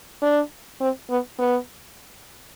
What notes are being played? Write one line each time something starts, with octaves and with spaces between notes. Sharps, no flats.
D4
C4
B3
B3